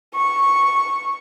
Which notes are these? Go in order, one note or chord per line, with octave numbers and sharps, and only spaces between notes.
C#6